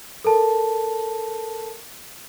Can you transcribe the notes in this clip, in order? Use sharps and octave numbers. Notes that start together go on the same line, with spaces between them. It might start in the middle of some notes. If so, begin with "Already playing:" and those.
A4 A#4 A5